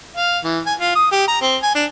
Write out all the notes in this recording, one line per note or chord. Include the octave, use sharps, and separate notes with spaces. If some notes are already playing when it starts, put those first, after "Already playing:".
F5
E3
G#5
F4
D#6
G4
A#5
C4
G#5
D4